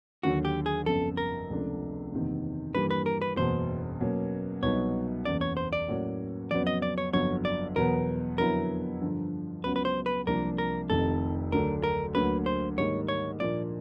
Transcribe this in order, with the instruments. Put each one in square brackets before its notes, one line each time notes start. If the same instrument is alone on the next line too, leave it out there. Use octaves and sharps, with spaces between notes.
[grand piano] D#2 D3 F#3 [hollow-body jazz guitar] F#4
[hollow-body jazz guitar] G4
G#4
[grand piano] G1 F2 C#3 [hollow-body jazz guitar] A4
[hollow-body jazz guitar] A#4
[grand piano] C#2 C3 F3 A3 D4
F#1 E2 C3 D#3
[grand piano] G2 E3 G3 A#3 [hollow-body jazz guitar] B4
[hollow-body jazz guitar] B4
A#4
B4
[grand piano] F#1 E2 B2 [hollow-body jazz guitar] C5
[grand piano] B2 F#3 A#3 C#4
[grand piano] C2 B2 F#3 B3 D#4 [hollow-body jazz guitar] C#5
[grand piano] F#1 E2 C#3 [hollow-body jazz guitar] D5
[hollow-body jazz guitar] C#5
C5
D5
[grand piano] A2 F#3 A#3 C#4 F#4
[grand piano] F2 C#3 F#3 B3 [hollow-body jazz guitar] D5
[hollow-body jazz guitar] D#5
D5
C#5
[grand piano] G1 F2 D3 F#3 [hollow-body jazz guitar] C#5
[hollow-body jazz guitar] D5
[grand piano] E2 B2 F#3 B3 [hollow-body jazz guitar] A#4
[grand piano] F2 D3 F#3 B3 E4 [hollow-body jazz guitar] A#4
[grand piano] G2 D3 F3
[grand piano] C#2 C#3 F#3 B3 [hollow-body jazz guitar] B4
[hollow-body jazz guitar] B4
C5
B4
[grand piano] C2 C3 F3 A#3 D4 [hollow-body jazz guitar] A#4
[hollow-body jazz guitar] A#4
[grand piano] F1 F2 C3 D#3 [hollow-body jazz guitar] A4
[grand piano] D2 D3 F#3 A3 D4 [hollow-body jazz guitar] A#4
[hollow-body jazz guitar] A#4
[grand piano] D2 D3 F#3 A#3 [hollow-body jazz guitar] B4
[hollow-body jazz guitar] C5
[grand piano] G#2 D#3 G3 A#3 [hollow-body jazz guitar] C#5
[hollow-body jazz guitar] C#5
[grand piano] A#2 F3 A#3 D4 [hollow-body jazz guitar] D5